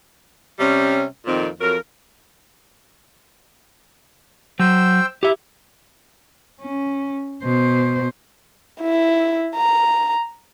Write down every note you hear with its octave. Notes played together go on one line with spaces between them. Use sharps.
C3 G3 C#4
F2 A#2 D#3 C4
F2 F#3 A#4
F#3 C5 G5 E6
E4 G4 E5
C#4
B2 C5
E4
A#5